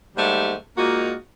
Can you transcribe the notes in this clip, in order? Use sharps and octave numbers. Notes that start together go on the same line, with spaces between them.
D#2 G#2 G3 A3 G4
A#2 G#3 A#3 D#4 F4 F#4